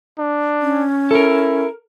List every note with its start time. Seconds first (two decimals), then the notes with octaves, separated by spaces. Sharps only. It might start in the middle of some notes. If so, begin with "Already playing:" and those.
0.19 D4
0.61 C#4
1.11 E4 A4 A#4